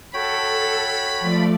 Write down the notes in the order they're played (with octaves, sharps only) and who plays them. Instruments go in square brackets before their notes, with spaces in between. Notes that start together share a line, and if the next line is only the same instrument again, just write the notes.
[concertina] F#4 C#5 G5 [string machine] A4 [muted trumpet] B5
[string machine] F3 A3 D5